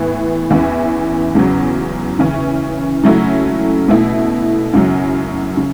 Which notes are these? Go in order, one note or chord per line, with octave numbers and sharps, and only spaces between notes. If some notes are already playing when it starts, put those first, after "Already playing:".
Already playing: A2 E3 B3 E4
E2 E3 C#4 E4
E2 C#3 F#3
C#3 E3 C#4
C#3 F#3 A3 C#4 E4
B2 A3 E4
F#2 C#3 F#3
C#3